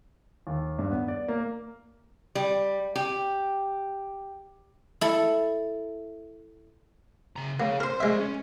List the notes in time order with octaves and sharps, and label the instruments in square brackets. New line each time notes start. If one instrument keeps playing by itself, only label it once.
[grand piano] D#2
G2
B3
D5
A#3
[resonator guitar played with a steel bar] G3
G4
[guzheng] E4 A4
[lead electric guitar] C#3 A#5
[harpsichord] A#3 [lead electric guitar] G#4 C#5
[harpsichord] A#4 C6 [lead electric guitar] C5
[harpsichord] G#3 E5 [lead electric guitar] C5 D5
[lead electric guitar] C#4